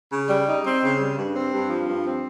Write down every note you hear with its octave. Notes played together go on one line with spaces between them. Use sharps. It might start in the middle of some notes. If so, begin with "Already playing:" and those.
C#3
G3
D#4
C4
C#3
G3
G2
C4
G2
F3
G2
C4